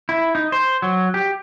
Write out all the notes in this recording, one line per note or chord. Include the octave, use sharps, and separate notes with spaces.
E4
D#4
C5
F#3
G4